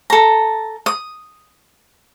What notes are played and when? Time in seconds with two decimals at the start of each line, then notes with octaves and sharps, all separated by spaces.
0.10 A4 A#5
0.86 D#6